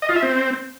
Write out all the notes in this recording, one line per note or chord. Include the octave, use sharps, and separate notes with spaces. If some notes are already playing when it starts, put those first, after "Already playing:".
D#5
F4
E5
C4